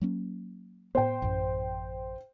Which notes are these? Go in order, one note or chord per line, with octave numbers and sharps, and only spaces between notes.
F#3 A#3 C#4
A2 B3 C5 G5
A1 F#2